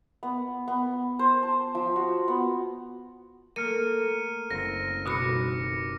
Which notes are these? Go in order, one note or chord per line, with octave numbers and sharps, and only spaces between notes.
B3
B3
C5
A5
F3
F#4
B3
A3 A#3 A#4 F6 C#7 D#7
F#1 C4 A#6
D#1 B2 F#4 B5 D6 C#7